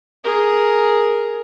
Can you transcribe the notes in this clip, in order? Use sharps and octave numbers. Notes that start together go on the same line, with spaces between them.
G#4 A#4